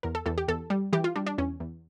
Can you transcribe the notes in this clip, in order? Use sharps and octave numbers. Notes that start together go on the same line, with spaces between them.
E2 A#4
A4
E2 A4
G4
E2 A4
G3
E3 G4
F4
G3 D4
D4
E2 C#4
E2